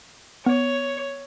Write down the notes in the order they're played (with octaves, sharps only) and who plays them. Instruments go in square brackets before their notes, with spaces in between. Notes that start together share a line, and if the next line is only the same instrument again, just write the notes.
[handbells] B3 [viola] C#5